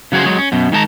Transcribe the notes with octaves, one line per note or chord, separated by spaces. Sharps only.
C#3 F#3 F#4 G#4 C5
F#3 G#3 C#5
C#4
F#2 B2
D#3 G#3 A5 A#5